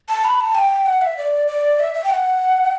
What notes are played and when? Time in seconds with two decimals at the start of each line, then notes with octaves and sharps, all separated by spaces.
0.09 A5
0.24 B5
0.40 A5
0.55 G5
0.86 F#5
1.02 E5
1.17 D5
1.47 D5
1.80 E5
1.94 E5
2.04 G5
2.10 F#5